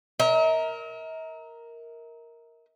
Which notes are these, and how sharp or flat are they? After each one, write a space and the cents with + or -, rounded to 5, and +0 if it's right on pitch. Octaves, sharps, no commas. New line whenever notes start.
A#4 +0 E5 -45